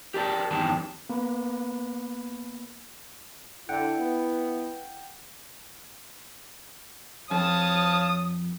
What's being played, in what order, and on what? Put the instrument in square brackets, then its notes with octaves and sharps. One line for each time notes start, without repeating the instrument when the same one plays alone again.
[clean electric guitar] G4 A#4 D5 A5
E2 G2 D#3 G4 A5
[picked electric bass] A#3 B3
[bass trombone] D3 [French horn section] E4 [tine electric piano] F#5 G5
[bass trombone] B3
[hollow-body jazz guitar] F2 [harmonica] C#5 F5 A5 [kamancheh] D#6